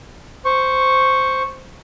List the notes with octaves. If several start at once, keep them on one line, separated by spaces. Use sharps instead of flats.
C5 C#6